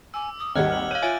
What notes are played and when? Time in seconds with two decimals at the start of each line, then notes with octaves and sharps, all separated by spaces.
0.14 G#5 D6 E6
0.39 D#6
0.56 G#1 D#2 G3 D#5 F#5 F6 F#6 G#6
0.70 F6 F#7
0.91 C#5 F5 F#6 G6 D#7 F#7
1.02 F4 C#5 E5 G#5 G#6 A6 D7